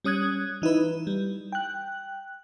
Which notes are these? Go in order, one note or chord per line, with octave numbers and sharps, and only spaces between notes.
G3 C#4 D#6 F#6 G#6
E3 D#4 E4 B4
G3
G5 F#6